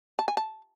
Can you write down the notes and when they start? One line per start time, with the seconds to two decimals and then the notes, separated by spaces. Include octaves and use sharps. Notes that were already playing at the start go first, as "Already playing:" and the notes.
0.19 A5
0.28 G#5
0.37 A5